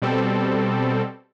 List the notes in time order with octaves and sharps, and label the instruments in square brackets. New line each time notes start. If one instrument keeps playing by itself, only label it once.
[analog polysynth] B2 G3 C4 A4